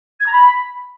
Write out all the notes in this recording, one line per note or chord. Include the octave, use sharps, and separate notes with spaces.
G#6
A#5
B5